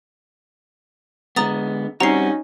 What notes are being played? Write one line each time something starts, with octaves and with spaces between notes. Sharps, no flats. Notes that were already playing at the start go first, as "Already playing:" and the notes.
D3 G#3 B3 A#5 D#6 A6
G3 C4 C#4 D#4 F#4 A#5 C7